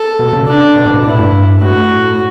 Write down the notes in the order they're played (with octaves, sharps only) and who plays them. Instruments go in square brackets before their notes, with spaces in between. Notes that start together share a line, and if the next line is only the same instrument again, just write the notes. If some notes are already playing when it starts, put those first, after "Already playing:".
Already playing: [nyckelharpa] A4
[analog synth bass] B2
C#3
[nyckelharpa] D4
[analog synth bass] B2
A2
B2
[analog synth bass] A2 [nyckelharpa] E4
[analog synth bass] G2
[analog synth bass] A2 [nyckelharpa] F#4